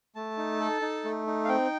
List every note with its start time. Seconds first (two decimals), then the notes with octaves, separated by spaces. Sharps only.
0.15 A3 A5
0.37 D#4
0.60 A4
0.82 D#4
1.05 A3
1.27 D#4
1.45 F5
1.49 C4 G5